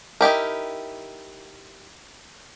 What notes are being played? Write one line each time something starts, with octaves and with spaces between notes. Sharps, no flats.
D#4 E4 G4 A#4